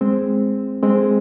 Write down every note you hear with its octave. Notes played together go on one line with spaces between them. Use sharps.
G#3 C4
G#3 C4